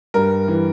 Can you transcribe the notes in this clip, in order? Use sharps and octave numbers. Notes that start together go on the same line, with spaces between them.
G2 A#4
E3